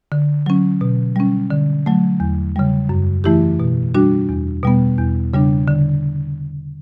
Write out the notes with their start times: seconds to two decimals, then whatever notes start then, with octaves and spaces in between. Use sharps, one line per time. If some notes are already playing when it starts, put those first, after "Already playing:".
0.12 D3
0.46 F#3 C#4
0.81 B2
1.16 G3 C#4
1.50 D3
1.86 F#3 A3
2.20 E2
2.56 C#3 G3
2.89 F#2
3.24 E3 A3 E4 G4
3.60 B2
3.94 G3 D4 F#4
4.29 E2
4.63 B2 G3 B3
4.98 E2
5.34 C#3 G3 D4
5.68 D3